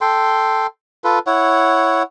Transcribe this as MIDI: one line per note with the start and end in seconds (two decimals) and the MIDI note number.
0.01 0.67 69
0.01 0.67 79
0.01 0.67 84
1.04 1.19 65
1.04 1.19 69
1.04 1.19 71
1.27 2.03 64
1.27 2.03 73
1.27 2.03 78